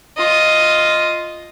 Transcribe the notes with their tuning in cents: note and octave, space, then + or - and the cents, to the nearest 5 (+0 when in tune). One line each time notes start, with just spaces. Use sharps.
F4 +0 D#5 +0